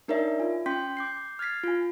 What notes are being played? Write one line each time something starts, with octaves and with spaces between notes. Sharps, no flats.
D4 D#4 A#4 C#5 D5 E5
F4 G#5
C#4 G5 C6 G6 B6
D6 G6 C7
F6 G#6 A6 B6 C7
F4 G#5